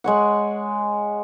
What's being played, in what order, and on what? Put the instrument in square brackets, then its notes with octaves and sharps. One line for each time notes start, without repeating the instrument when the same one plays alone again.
[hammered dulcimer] G#3 C#5 F#5